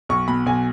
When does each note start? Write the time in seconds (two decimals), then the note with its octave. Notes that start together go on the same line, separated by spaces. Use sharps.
0.09 B1 C#6
0.28 B2 B5
0.46 B1 G#5